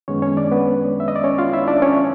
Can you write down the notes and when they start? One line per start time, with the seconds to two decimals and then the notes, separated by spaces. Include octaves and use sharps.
0.08 F#2 D#3 G#3 B3 C#4 C#5
0.22 C#4 C#5
0.37 D4 D5
0.51 B3 B4
1.00 E5
1.08 D#5
1.16 D5
1.24 C#4 C#5
1.38 F4 F5
1.53 E4 E5
1.68 D4 D5
1.82 C#4 C#5